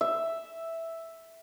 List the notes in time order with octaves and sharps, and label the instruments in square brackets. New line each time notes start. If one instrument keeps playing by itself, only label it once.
[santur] E5